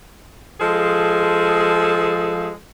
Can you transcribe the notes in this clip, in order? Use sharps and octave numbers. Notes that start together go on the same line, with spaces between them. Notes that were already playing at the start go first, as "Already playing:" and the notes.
F3 G#3 G#4 A4